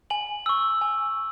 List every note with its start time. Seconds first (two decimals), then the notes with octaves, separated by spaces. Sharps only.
0.10 G#5 F#7
0.46 C#6 E6
0.81 G#5